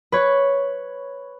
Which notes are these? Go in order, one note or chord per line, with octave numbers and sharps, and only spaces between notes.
B4 C#5